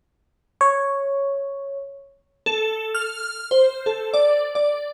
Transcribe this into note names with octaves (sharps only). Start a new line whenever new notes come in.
C#5
A4
F6
C5
A4
D5
D5